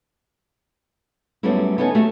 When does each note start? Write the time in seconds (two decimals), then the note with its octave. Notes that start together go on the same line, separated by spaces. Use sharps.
1.43 F#2 G3 A3 B3 C#4 E4
1.78 B3 C#4 D#4 A4 G5 G#5
1.95 A3 F#4 G4